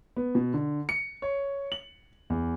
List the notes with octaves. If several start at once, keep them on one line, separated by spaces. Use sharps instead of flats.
B3
B2
D3
C#7
C#5
F#7
E2